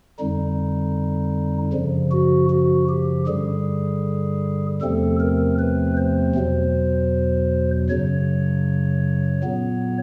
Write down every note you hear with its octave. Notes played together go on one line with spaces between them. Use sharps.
F2 D3 G3 D#4
F#2 C#3 F3
F#4
F#4
G4
G2 D3 G3 G#4
E2 C3 F3 A3 C4 A4
A#4
B4
C5
E2 B2 F#3
F#2 C#3 F#3 C#5
A#2 F#3 B3